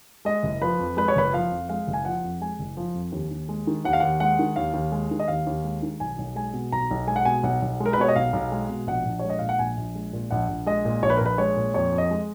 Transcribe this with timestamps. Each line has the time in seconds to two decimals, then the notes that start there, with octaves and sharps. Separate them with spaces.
0.25 G#3 D#5
0.43 F#1
0.62 F3 B4
0.79 F2
0.97 G#3 B4
1.08 C#5
1.16 F#1 B4
1.33 F3 F5
1.51 F2
1.69 G#3 F5
1.88 F#1
1.93 G#5
2.05 F3 F#5
2.24 F2
2.41 G#3 G#5
2.59 F#1
2.77 F3
2.94 F2
3.12 D#2
3.31 D#2
3.49 G#3
3.67 D#3
3.85 D#2 F#5
3.93 F5
4.00 D#2 F#5
4.20 G#3 F#5
4.39 D#3
4.56 D#2 F5
4.74 D#2
4.92 G#3
5.11 D#3
5.20 D#5
5.28 D#2 F5
5.47 D#2
5.64 G#3
5.83 D#3
6.00 B1 G#5
6.18 B1
6.36 G#3 G#5
6.53 B2
6.72 B1 A#5
6.91 B1
7.07 G#3 G#5
7.16 F#5
7.25 B2 G#5
7.43 B1 F#5
7.62 B1
7.80 G#3
7.86 A#4
7.93 B4
7.98 B2 C#5
8.08 D#5
8.16 B1 F5
8.33 B1
8.52 G#3
8.69 B2
8.87 A#1 F#5
9.05 A#1
9.20 G#3 C#5
9.30 D#5
9.39 A#2 F5
9.49 F#5
9.59 A#1 G#5
9.77 A#1
9.95 G#3
10.13 A#2
10.31 A#1 F#5
10.48 A#1
10.66 G#3 D#5
10.85 A#2
11.02 A#1 C#5
11.10 B4
11.17 A#4
11.21 A#1
11.26 B4
11.38 G#3 C#5
11.56 A#2
11.74 F2 C#5
11.92 F2
11.98 D#5
12.11 G#3